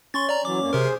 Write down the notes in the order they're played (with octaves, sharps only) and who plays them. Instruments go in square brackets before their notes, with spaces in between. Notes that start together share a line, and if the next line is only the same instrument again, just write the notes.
[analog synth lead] C#4 [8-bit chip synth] C6 C#6 A6
[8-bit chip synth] D5 A#5
[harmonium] E3 F#3 [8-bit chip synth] D6
[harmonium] F2 A#3
[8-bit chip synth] C3 A#4 [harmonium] G#4 C5